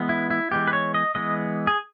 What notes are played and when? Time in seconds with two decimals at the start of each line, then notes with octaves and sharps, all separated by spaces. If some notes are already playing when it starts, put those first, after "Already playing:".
Already playing: E3 G#3 B3
0.09 E4
0.30 E4
0.51 E3 G#3 B3 G4
0.67 B4
0.73 C#5
0.94 D#5
1.15 E3 G#3 B3 D#5
1.67 G#4